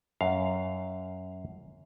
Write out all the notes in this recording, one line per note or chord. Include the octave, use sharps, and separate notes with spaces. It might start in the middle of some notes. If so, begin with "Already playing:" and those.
F#2 F5